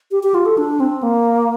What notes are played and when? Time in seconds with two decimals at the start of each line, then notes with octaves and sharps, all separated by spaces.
0.11 G4
0.23 G4
0.34 F4
0.46 A4
0.58 D4
0.80 C4
1.03 A#3